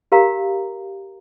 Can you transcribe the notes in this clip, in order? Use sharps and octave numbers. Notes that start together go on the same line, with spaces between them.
G4 A#4 F5 A#5